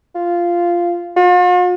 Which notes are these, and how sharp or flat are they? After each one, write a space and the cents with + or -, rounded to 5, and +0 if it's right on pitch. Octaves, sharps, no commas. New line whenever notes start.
F4 -10
F4 +45